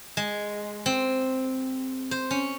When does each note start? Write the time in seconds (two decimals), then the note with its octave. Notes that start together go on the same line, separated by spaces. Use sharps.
0.17 G#3
0.86 C4
2.11 C5
2.31 C#4